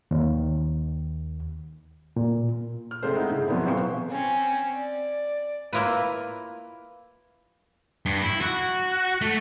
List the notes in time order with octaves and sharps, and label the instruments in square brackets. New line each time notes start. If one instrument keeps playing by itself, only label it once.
[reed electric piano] D#2
A#2
[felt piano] F6
C3 G#3 A3 G4 C5
G#3 D#4 E4 F#5
G2 C#3
B2 F3 F#3 B3 C4 E4
D#1 F3 B4 C5 F5 C#6
[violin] C4 C#4
D5
[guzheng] A#3 E4 F4 B4
[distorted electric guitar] G2
E4
F#4
A3